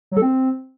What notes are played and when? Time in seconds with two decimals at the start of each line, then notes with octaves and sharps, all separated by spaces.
0.11 F#3
0.17 A4
0.22 C4